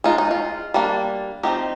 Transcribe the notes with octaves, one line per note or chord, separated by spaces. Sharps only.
G#3 D#4 F4
D#4
F4
G3 A#3 D4
F3 C4 D#4 G4